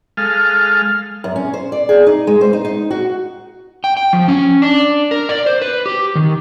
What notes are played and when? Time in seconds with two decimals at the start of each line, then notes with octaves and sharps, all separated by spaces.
0.17 G#3 A4 F5 F6
1.24 F#2
1.36 C#4
1.54 C5
1.72 D5
1.89 G#4
2.07 D#4
2.27 G#3
2.41 C5
2.53 D#4
2.65 D#4
2.91 F#4
3.84 G5
3.97 G5
4.13 F3
4.28 C#4
4.62 D4
5.11 A#4
5.29 D5
5.46 C5
5.62 B4
5.86 G4
6.15 D#3